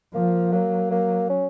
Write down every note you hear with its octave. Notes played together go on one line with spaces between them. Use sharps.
F3 A#3
F#3 A#3
A#3
C#4